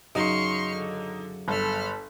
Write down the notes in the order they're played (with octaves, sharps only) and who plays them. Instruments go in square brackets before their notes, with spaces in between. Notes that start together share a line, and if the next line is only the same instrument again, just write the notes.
[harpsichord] F#2 C#3 F#3 [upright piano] D#4 [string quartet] C6 C#6 F6
[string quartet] D3
[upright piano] G1 [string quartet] A4 B5 F6